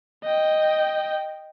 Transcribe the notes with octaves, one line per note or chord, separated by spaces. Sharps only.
D#5 G5